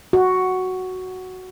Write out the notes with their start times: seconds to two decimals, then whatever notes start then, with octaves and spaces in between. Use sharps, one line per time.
0.13 F#4